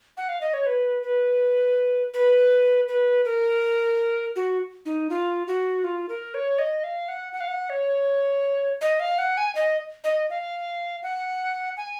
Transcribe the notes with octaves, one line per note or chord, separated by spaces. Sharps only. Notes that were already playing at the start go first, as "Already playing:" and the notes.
F#5
F5
D#5
C#5
B4
B4
B4
B4
A#4
F#4
D#4
F4
F#4
F4
A#4
C#5
D#5
F5
F#5
F#5
F5
F#5
C#5
D#5
F5
F#5
G#5
D#5
D#5
F5
F#5
G#5